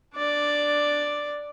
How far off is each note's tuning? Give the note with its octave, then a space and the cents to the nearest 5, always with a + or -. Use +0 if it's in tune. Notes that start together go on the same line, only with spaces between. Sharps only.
D4 +5 D5 +0